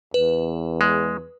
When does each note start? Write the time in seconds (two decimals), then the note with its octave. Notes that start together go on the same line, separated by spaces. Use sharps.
0.14 E2 B4
0.81 G#3